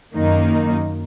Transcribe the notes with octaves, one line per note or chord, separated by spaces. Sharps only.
F#2 D#3 A#3 D#4